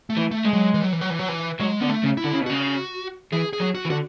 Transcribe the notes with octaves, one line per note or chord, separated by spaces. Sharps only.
A3
E3
A3
G#3
F#3
E3
F#3
E3
F#3
E3
F#3
E3
F#3 G#3
D3 B3
A3
C#3
E4
D3
C#3
B2
C#3 F#4
E3 G#4
G#4
F#3
F#4
E3
D3 F#4